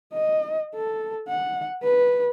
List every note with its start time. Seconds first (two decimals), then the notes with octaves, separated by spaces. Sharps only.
0.13 D#5
0.75 A4
1.28 F#5
1.83 B4